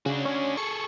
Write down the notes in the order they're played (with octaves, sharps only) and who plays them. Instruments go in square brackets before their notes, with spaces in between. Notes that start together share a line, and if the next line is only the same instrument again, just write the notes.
[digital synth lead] C#3 [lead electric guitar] D4 F#4
[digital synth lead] C#4
[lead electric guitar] G#4 A4 [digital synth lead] C#6